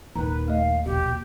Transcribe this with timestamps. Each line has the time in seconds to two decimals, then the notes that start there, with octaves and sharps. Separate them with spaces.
0.16 D#1 D#2 D#3 B4 A#5
0.48 A3 D#5 F5
0.85 E1 A#1 B2 G4